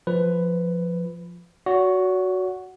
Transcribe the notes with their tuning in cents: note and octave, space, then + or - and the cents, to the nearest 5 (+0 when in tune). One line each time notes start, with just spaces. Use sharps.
F3 +0 B4 +10
F#4 +0 C#5 +45